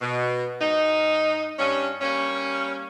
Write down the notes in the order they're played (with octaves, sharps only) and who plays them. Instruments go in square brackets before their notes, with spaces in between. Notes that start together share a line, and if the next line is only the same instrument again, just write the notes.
[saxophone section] B2
G#2 D#4
G2 G3 C#4
G3 A#3 C#4